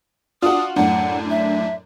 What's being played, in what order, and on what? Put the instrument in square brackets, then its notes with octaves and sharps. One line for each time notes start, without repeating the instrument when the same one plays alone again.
[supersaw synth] D4 [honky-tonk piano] F4 F#4 [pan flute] D#6
[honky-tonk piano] F#2 A2 [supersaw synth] D4 [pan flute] F#5
[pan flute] E5